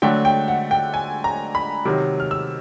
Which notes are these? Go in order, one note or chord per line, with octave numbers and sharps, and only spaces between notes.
D3 F#3 A3 G5
G5
F#5
G5
G#5
A#5
B5
C3 D#3 F#3
F6
E6